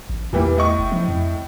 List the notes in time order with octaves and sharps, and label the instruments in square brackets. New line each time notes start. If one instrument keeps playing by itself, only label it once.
[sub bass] A1
[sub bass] E2 [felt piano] A#2 E3 G3
[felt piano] A2 D#5 C#6
[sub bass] F1
F3
F2